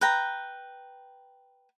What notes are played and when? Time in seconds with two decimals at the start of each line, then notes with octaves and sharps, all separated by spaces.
0.01 B4 G5 A#5